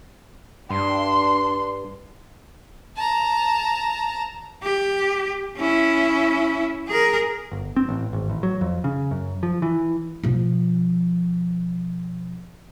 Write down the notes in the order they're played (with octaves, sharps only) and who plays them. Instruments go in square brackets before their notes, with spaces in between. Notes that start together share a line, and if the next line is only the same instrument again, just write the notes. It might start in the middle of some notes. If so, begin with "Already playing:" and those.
[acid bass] G2 [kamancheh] D4 C6
[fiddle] A5 A#5
[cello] G4
C#4 E4
G#4 A#4
[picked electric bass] G1
C4
A1
G#1
A1
F#3
F2
C#3
F#2
F3
E3
[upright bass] B2 F3